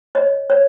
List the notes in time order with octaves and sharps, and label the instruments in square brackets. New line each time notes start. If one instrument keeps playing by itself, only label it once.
[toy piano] C#5 D#5
C#5